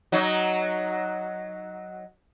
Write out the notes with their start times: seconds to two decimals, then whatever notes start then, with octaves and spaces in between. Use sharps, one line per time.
0.12 F#3 D#4